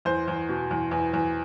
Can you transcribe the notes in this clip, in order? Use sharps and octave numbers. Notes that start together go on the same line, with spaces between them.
E2 C5
E2
B2
E2
E2
E2